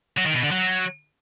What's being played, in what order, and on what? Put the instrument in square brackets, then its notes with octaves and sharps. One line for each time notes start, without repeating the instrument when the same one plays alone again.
[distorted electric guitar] F#3
D#3
B2
D3
F#3